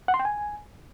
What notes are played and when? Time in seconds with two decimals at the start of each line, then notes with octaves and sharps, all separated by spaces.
0.08 F#5
0.14 C6
0.19 G5
0.25 G#5